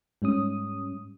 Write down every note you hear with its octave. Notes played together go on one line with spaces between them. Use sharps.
G#2 G3 C#4 D#6